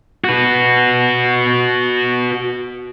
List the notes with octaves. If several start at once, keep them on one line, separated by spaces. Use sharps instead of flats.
F#4 B4